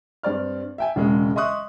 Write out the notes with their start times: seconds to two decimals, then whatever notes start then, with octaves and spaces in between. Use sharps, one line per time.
0.23 G2 C4 D5 F6
0.78 E5 G5 G#5
0.96 E1 C#3 G#3
1.36 D#5 E5 C6 C#6 D#6 F#6